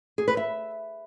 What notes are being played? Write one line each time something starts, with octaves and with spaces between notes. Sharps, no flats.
G#4
B4
E5